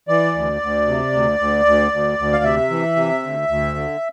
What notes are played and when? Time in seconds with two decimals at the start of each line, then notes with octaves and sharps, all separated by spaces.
0.08 E3 D5
0.35 D2
0.61 D2
0.87 C3
1.13 D2
1.39 D2
1.65 D2
1.92 D2
2.19 D2
2.33 F5
2.44 C3 E5
2.70 E3
2.96 C3
3.22 D2
3.48 D2
3.75 D3